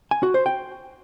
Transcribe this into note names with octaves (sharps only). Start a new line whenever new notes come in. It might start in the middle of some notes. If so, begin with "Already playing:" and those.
G#5
F#4
C5
G5